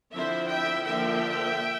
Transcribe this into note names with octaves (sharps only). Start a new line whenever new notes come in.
D3 F3 C4 E4 C5 E5
E5 G5
D3 F3 A#3 E5 G5